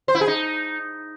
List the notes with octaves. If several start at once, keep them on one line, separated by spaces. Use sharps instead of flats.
C5
E4
G#4
D#4